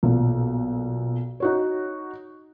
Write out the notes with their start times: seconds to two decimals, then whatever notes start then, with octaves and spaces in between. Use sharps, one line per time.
0.03 B1 A#2
1.40 D#4 F#4 C#5